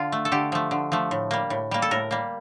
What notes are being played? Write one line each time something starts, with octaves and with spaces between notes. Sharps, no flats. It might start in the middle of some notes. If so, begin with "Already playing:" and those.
Already playing: D3 F4
A3
A4
D3 G4
F3 A3
D3
F3 A3
A2
G3 A#3
A2
G3 A#3
A4
A2 A#4
G3 A#3